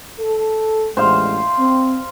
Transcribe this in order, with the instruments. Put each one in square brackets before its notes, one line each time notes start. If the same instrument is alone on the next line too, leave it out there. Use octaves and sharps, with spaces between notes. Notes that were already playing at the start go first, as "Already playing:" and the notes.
[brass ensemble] A4
[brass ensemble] A1 E2 G#3 [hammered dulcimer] C5 F5
[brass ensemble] C4